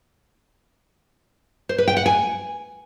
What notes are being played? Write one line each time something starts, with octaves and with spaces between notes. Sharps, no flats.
C5
B4
G5
F#5
G#5